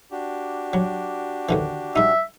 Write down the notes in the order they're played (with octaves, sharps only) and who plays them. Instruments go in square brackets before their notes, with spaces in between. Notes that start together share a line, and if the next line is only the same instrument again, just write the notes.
[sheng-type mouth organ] D4 F#4 G4
[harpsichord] F#3
D#2 D3 E3
[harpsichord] G3 D#4 [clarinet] E5